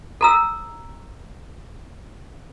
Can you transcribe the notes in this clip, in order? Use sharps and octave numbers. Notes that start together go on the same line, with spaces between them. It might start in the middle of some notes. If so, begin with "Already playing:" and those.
A4 A#5 E6